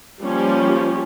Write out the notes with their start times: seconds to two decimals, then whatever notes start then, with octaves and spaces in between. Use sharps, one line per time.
0.22 F3 G3 A#3 C#4 G4